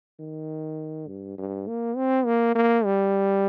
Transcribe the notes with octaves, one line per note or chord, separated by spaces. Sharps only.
D#3
G2
G2
A#3
C4
A#3
A#3
G3